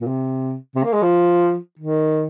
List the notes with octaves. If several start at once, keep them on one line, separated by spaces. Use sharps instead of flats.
A#2
C3
C3
A#3
G#3
F3
D#3